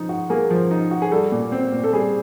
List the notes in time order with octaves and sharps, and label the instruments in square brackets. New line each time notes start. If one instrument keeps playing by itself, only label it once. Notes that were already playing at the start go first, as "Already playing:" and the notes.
Already playing: [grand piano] F3 D#4
F#4
[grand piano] A#3 [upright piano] G#4 A#4
[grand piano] F3
D#4
F#4
[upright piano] G#4
[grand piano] G3 [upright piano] A4
[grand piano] A#2
C4
A#2
[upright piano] A4
[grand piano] G3 [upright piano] G#4